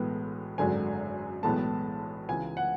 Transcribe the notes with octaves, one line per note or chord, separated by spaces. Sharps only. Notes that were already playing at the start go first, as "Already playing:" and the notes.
Already playing: B1 A2 E3 G#3 B3
G#1 F#2 D3 G#3 G#5
B1 A2 E3 G#3 B3 A5
C#2 C#3 E3 G#5
F#5